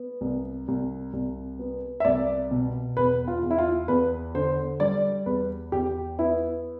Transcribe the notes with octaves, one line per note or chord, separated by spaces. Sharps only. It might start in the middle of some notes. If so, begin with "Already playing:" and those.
Already playing: B3
C2
C2
C2
B3
E5
C2 D5
B2
E2 B4
F4
E2
E4
F4
E2 B4
D3 C5
G3 D5
E2 B4
E2 G4
B3 E4